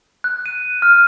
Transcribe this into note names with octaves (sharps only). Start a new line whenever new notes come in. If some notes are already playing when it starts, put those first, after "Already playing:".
F#6
D#7
F6